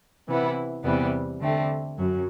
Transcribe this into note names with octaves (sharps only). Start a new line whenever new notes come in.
C3 E3 B3 E4
E2 C3 E3 G3 B3
D3 A3 C4
F#2 F#3